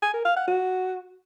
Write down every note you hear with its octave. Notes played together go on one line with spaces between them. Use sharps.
G#5
A#4
F5
F#5
F#4